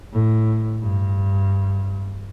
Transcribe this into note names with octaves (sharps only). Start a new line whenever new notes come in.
A2
G2